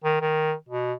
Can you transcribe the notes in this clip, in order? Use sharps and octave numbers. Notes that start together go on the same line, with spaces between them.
D#3
D#3
B2